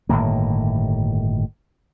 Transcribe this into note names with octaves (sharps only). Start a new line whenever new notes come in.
G1 A2 D#3 A#3